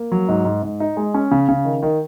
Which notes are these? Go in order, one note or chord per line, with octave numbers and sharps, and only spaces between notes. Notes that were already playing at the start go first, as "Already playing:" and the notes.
Already playing: A#3
F#3
G#2
G#2
G#2
D#4
G#3
C#4
C#3
C#3
D#3
D#3